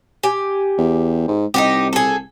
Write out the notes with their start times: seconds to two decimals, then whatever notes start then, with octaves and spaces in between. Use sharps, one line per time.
0.23 G4 G#5
0.78 E2
1.28 G#2
1.54 C2 D#4 F#4 G4
1.93 G#4 A4